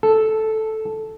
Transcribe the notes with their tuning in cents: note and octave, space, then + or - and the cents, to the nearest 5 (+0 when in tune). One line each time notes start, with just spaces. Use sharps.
A4 -5